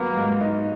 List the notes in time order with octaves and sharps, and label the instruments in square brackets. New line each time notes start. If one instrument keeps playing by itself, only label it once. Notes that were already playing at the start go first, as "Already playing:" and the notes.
Already playing: [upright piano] F#3 B3 [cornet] A#3
[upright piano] G#2
D#4